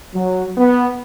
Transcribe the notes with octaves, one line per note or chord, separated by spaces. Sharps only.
F#3
B3